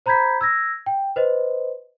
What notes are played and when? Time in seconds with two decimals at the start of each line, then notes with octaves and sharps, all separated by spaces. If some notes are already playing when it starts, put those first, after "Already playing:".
0.06 C5 A#5 B5 G6 G#6 B6
0.41 E6 G#6 A#6
0.86 G5
1.16 B4 C5 D#5